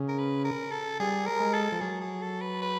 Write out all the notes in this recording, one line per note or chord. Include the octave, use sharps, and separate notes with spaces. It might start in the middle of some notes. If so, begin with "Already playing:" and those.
Already playing: C#3
A#4
B4
A#4
A4
G3 G#4
A#4
G#3
A4
F3
F#3 G#4
G#4
A4
B4
B4